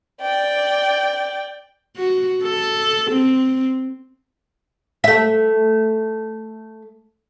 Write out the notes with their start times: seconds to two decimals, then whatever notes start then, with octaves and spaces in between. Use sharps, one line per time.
0.21 D5 G5
1.97 F#4
2.43 A4
3.11 C4
5.04 A3 E5